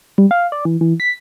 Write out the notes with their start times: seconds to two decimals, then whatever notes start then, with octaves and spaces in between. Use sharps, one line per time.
0.18 G3
0.31 F5
0.52 D5
0.65 E3
0.81 E3
1.00 B6